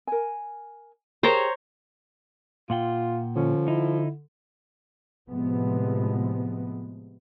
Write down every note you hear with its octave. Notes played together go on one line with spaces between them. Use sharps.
A#4 G#5
G4 G#4 A#4 C5 C#5 A#5
A#2 F4 F#5 G5
D3 F3 C#4
D#4 E4
A2 C3 F3 G#3 B3